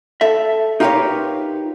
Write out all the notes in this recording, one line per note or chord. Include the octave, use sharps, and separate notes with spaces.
A4 E5
D#4 F4 G4 A#4 B4 C#5